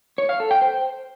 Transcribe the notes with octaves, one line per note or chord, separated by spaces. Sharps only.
C#5
F5
A4
G5
C5